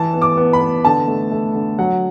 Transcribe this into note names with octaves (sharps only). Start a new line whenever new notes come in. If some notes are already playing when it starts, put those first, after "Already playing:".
Already playing: E3 A5
B3
D6
B3
B5
B3
D3 A5
A3
A3
D3
F#3 F#5